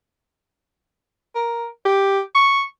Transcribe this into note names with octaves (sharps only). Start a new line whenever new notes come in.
A#4
G4
C#6